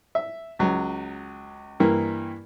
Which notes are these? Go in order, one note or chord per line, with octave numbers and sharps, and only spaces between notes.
E5
C#2 F#3
G2 E3 A#3